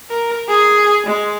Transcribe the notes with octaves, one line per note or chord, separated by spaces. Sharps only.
A#4
G#4
G#3